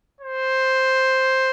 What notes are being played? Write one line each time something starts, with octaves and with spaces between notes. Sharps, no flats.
C5